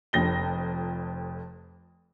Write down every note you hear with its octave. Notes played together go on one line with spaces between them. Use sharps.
F1 F2 A#6 G7